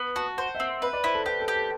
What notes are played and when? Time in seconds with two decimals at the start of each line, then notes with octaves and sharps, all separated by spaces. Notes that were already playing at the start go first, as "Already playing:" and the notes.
Already playing: B3
0.16 F#4 A5
0.38 C5 F#5
0.55 E5
0.60 C4 F#5
0.82 B4 E5
0.93 D5
1.04 E4 C5
1.14 A4
1.25 G4 B4
1.41 A4
1.48 G4
1.55 A4